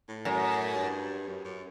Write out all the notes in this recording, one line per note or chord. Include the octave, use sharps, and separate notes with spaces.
A2
F#2
G2
F#2
F#2